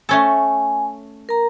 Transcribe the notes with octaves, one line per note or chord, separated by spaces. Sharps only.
A3 C#4 A4 G#5
A#4 A#5